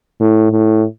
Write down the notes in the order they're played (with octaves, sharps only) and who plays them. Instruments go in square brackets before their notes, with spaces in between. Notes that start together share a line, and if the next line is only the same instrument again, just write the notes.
[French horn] A2
A2